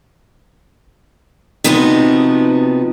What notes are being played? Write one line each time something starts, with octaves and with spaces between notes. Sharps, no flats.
C3 F3 B3 D#4 F#4